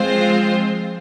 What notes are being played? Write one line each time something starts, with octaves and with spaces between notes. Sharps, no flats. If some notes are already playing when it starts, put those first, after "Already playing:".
Already playing: F3 G#3 C4 F4 C5